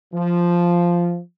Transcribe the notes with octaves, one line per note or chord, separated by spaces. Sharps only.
F3